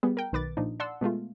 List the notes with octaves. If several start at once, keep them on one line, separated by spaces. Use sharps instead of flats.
G3 B3 G#4
A#4 G5
B1 D#3 B4 D6 A6
A#2 F3 D4 D#4
D5 F#5 A5 C6 E6
B2 G#3 A3 F4